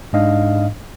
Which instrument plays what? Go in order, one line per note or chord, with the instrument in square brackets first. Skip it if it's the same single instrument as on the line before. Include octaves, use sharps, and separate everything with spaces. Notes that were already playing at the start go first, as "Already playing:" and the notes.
[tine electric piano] G#2 D4 D#5 F5